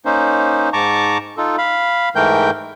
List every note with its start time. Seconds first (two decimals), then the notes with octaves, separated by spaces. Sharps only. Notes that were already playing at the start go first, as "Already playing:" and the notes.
0.05 A#3 C#4 D#4 C5
0.73 G#2 A5 A#5 C#6 D6
1.37 D#4 F4 A4
1.58 F5 B5
2.15 G#2 E3 A3 A#4 G5 G6